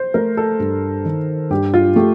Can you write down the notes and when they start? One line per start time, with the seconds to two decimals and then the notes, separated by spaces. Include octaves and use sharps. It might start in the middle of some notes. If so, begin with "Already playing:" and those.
Already playing: C5
0.14 A3 A#4
0.37 A4
0.60 G2
1.05 D#3
1.50 G2 G4
1.74 F4
1.96 A3 G4